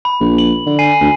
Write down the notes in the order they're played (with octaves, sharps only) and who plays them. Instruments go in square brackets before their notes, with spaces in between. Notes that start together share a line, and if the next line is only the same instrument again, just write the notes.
[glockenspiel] B5
[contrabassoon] A#1
[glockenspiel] F#7
[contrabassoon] D3
[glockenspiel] G#5 C7 D#7
[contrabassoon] D2